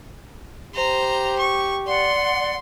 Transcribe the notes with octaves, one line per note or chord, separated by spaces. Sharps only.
G4 C5 A#5
C#6
D5 F#5 C6